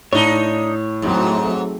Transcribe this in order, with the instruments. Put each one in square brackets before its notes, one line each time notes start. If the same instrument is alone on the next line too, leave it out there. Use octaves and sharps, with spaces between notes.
[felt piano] A2 [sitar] D4 D#4 [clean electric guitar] C#5
[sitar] G#2 [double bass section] F#3 A3 C4